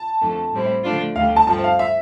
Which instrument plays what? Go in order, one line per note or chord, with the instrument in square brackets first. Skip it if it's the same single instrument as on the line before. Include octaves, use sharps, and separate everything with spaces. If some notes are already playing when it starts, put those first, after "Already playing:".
Already playing: [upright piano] A5
[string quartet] F2 D3 A3
A2 G3 C4 E4
D3 F3 A3 D4 F4
[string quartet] D2 D3 G3 [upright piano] F5
[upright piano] A5
[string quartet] G2 F3 A3 C4 [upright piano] A5
[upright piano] F5
E5